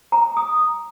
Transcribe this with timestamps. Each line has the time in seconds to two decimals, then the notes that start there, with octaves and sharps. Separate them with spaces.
0.12 A#5
0.37 D#6